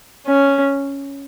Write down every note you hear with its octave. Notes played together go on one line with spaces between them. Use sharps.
C#4